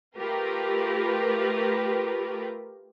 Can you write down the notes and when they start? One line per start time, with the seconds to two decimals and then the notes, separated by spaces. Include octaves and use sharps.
0.17 A3 F4 G4 A#4 B4